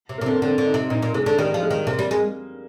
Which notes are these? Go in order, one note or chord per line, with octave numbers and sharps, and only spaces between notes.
C3
A#3
C3
D3 C4
A#3
D3 C4
D3
D#4
C3
A#2 D#4
A#2
C3 G#3
D3
D#3 G3
F3
G#3
D#3
C3 A#3
G3
G#3